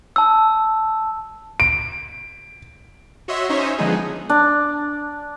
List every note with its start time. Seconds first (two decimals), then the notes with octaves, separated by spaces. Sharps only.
0.16 A5 E6
1.60 D7
3.28 F#4 C#5 D#5 E5 C6
3.49 C#4 D#4 C5 C#5 D#5 E5
3.78 D3 F3 G#3 B3 D#4 G#4
4.29 D4